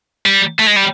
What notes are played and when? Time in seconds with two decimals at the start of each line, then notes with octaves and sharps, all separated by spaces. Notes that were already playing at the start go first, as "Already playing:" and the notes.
0.26 G3
0.60 A3
0.68 G#3
0.77 G3